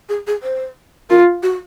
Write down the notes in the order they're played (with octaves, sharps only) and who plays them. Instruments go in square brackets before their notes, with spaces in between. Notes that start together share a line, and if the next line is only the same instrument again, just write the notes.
[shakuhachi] G#4
G#4
C5
[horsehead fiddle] F4 [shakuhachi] A#4
[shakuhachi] F#4